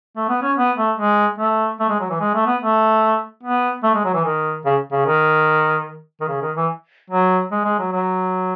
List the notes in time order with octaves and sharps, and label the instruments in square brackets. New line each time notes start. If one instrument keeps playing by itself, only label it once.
[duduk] A3
B3
C#4
B3
A3
G#3
A3
A3
G#3
F#3
E3
G#3
A3
B3
A3
B3
A3
G#3
F#3
E3
D#3
C#3
C#3
D#3
D#3
C#3
D#3
E3
F#3
G#3
G#3
F#3
F#3